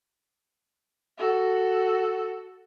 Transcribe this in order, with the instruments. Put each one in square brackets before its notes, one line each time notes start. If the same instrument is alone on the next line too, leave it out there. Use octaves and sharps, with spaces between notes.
[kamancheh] F#4 A4